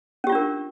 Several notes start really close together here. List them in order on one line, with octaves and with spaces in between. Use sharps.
C#4 G4 F4 D4 A#4